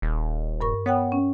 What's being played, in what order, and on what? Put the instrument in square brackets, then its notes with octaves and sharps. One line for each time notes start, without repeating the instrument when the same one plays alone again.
[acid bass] D#1
[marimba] G2 A#4 C#6
[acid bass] B3 [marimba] C#5 F#5 G5
[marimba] C#4